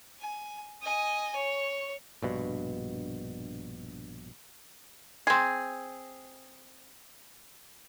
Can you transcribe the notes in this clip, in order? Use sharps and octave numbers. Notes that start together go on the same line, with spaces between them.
G#5
D#5 G#5
C#5
A#1 G2 B2
C4 G#4